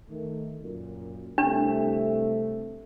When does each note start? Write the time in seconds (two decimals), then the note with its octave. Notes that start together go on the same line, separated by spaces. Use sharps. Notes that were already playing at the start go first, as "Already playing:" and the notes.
0.10 D#3 A3
0.62 F#2 A#2
1.38 C2 C3 A3 D4